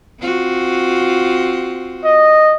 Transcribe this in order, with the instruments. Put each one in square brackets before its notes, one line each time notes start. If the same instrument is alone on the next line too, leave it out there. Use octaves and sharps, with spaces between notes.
[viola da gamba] C4 F4 F#4
[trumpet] D#5